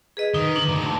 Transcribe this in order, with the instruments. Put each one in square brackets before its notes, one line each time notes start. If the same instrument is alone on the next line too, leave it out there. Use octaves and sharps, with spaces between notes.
[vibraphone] G#4 B4 D#5
[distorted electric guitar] D#3 [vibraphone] D#4 B4
[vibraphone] D4
[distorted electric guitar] D2 A#2
[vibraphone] A5